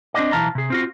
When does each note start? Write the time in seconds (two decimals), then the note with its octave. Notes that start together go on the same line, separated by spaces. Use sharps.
0.14 C4 D4 F#4 C5 D5 D#5
0.32 B1 E3 F5 A5 A#5
0.55 C3 G#4
0.70 C4 F4 F#4